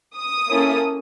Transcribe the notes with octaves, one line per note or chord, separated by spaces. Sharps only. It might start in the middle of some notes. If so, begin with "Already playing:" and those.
D#6
A#3 C#4 E4 A4